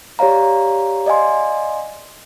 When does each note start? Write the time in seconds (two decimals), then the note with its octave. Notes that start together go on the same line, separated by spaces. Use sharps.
0.19 G4 C#5 D5 F5 A#5
1.06 D5 D#5 F5 G#5 C6